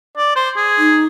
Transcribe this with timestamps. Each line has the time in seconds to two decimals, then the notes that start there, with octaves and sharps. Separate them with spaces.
0.17 D5
0.36 C5
0.56 G#4
0.78 D#4